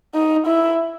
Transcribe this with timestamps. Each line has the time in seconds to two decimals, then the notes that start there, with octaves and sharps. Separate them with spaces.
0.15 D#4
0.47 E4